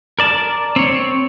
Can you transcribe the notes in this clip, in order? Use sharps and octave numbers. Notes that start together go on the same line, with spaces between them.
A#4 D5 A5
C4 C#5